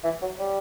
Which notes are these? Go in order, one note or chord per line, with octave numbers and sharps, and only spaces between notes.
E3
F#3
G3